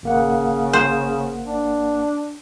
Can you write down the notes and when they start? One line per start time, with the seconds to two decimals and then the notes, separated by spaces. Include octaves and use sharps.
0.03 G#1 C#3 A#3 F#5
0.73 C5
1.44 D4